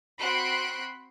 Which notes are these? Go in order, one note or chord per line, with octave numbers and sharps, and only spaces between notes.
C4 F#4 B5 C6 F#6 D7